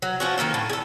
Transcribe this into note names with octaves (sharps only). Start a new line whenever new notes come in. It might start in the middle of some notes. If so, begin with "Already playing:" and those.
F#3
F3 C#4 F#4
D#3 F3 A#3 A4
A2
G#4 A4